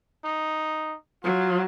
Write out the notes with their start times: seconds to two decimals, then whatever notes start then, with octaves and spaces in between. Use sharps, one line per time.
0.25 D#4
1.23 F#3 F4